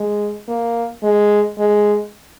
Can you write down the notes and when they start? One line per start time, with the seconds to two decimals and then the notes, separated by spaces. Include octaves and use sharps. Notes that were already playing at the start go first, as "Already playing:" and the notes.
Already playing: G#3
0.48 A#3
1.03 G#3
1.58 G#3